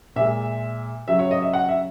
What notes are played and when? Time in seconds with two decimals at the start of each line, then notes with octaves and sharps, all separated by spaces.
0.16 A#2 G#3 E5
1.08 C#3 F#3 E5
1.19 C#5
1.31 D#5
1.42 E5
1.53 F#5
1.69 E5